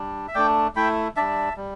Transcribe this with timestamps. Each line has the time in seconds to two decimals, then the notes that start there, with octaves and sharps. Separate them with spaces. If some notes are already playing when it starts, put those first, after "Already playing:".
Already playing: G3 D4
0.28 E5
0.35 A3 D4 D5 G5
0.76 A3 E4 G5 B5
1.17 G3 D4 E5 A5
1.57 G3